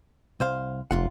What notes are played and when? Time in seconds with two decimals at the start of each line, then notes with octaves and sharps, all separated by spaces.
0.40 C2 C5 F5
0.91 F1 F#2 F4 F#5